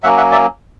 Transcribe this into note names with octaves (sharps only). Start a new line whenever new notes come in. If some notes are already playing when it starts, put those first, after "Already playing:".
F#3 A#3 C#4 E5 F#5
E5 F#5
D5 E5